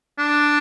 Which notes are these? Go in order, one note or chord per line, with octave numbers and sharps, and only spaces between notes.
D4